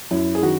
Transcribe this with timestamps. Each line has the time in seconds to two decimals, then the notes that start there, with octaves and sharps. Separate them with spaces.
0.11 F#2 E4
0.35 G#4
0.43 D#3 F#4